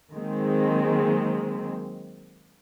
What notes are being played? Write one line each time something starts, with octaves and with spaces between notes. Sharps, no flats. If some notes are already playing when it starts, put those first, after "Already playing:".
D#3 F#3 G#3 A#3 C4